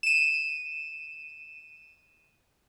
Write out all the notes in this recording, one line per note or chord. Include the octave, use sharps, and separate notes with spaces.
D#7 E7